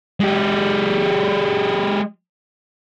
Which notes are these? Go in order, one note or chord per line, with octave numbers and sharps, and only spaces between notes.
G#3 G4